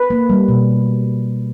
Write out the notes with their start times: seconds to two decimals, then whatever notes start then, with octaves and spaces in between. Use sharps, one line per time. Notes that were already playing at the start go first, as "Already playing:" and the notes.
Already playing: B4
0.10 A#3
0.30 G3
0.49 B2